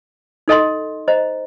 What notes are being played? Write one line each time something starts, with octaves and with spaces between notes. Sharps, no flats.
D#4 A4 D#5 A5 C6
C5 D#5 A#5